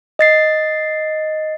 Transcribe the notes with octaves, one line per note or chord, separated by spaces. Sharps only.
D#5 A6 C7